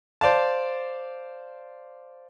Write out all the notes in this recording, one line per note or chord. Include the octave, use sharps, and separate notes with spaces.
C5 D5 F5 A5